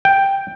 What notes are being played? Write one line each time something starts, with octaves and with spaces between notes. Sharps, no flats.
G5